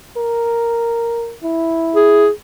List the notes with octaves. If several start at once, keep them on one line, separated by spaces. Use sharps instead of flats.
A#4
E4
G#4